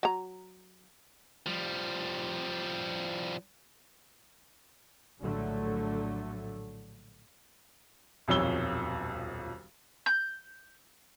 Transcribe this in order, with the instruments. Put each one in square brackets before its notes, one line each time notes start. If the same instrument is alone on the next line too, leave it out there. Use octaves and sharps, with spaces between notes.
[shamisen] F#3 A#5
[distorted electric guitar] F3 G3
[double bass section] A#1 A2 D3 F#3 A3
[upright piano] D#1 B1 F2 C#5 E6 G7
[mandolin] G6